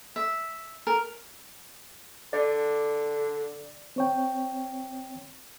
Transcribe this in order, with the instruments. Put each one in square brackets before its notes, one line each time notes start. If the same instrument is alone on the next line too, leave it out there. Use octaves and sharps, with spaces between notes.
[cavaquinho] E5
A#4
[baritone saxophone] D3 [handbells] D5
[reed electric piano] C4 C#5 G5